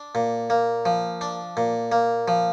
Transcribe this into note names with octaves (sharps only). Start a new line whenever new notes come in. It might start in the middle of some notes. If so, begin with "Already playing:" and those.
Already playing: D4
A#2
A#3
F3
D4
A#2
A#3
F3